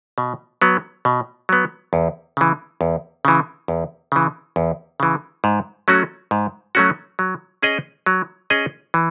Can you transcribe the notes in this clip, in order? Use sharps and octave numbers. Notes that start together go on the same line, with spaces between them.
B2
F#3 B3
B2
F#3 B3
E2
C#3 E3
E2
C#3 E3
E2
C#3 E3
E2
C#3 E3
G#2
F#3 A3 C#4 F#4
G#2
F#3 A3 C#4 F#4
F#3
C#4 G#4 D#5
F#3
C#4 G#4 D#5
E3